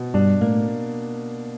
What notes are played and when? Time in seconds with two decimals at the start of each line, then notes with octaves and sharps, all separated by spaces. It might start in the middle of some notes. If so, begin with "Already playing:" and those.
Already playing: B2
0.14 G2 G3 D4
0.41 A2 A3 A#3